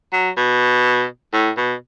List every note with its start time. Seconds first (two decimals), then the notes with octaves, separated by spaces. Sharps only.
0.13 F#3
0.37 B2
1.33 A2
1.57 B2